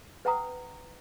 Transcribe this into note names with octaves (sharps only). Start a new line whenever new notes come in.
B4 F#5 G5 A#5 D#6